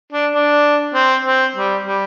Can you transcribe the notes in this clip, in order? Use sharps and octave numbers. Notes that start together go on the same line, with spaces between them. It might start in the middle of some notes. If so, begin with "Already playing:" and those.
D4
D4
C4
C4
G3
G3